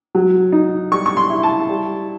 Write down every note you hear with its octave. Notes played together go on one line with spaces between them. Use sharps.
F#3
D#4
G3 C#6
C#6
C6
E4
A5
G3